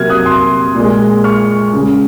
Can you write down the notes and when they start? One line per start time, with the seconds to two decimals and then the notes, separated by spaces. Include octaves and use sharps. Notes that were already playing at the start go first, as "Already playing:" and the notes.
Already playing: C3 F#3 A#3 F6 G#6
0.10 D#6 F#6
0.26 C6 D#6
0.75 A#2 G#3
1.24 C#6 F6
1.74 C#3 G#3